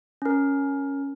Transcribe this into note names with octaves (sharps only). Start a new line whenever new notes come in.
C#4 A#4